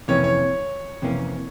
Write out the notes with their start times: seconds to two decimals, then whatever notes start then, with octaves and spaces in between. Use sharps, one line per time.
0.08 F2 C3 E3 A#3 C#4 C#5
0.24 C#5
1.02 F2 C3 E3 A#3 C#4